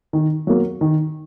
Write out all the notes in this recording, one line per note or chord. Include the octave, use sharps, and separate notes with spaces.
D#3
F#3 A#3
D#3